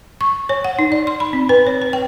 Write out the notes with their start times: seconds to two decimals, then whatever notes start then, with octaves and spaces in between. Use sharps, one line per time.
0.21 C#6
0.49 C#5
0.64 F#5
0.79 D#4
0.92 D5
1.07 C6
1.20 B5
1.33 C4
1.49 B4
1.67 C#5
1.82 B4
1.93 G5